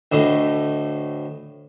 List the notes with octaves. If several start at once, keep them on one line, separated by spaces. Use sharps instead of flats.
D2 A2 D#5